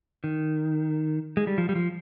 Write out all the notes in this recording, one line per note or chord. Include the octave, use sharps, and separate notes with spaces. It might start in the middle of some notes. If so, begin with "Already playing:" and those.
D#3
G#3
G3
F3
G3
F3